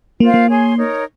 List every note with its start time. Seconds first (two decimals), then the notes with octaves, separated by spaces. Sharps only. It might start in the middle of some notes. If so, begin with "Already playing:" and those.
0.19 A#3 F4 C5 F5
0.34 A#3
0.48 G#4 C#5 G#5 C6
0.76 D#4 A#4 C#5